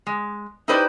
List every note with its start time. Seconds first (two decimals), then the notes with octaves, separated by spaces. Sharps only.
0.07 G#3
0.68 D#4 E4 G4 B4 C5 D5